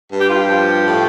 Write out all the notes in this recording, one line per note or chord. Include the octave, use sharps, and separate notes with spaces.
G2
G4
F4
G4
F3
A2